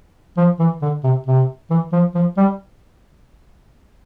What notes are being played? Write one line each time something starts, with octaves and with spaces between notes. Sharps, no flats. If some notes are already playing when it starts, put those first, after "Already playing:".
F3
E3
D3
C3
C3
E3
F3
F3
G3